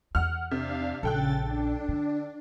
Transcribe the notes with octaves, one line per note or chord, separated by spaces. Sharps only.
E2 F#5 F6
C3 D4 F5
A#1 C#3 A4 G5 F#6 A6
D4
D3